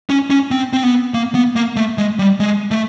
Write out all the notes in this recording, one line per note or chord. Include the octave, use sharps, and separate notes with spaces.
C#4
C#4
C4
C4
B3
A#3
B3
A#3
A3
G#3
G3
G#3
A3